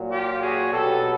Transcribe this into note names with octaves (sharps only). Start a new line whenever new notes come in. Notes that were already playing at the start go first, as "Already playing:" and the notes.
Already playing: A#2 F#3
F4 G4
F#4 G#4
B2 F#3 G4 A4